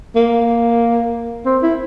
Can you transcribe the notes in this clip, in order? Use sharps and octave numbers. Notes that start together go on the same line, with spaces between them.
A#3
C4
E4